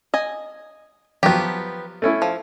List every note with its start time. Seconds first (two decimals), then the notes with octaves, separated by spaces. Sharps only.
0.14 D#5 G#5
1.23 F3 F#3 B3 G4
2.02 A3 C#4 E4
2.22 F3